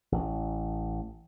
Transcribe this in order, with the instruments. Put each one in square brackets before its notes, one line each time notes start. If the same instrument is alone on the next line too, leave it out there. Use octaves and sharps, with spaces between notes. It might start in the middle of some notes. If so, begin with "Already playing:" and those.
[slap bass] A1